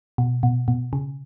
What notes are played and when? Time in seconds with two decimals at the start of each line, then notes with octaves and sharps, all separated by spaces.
0.18 B2
0.43 B2
0.68 B2
0.93 C#3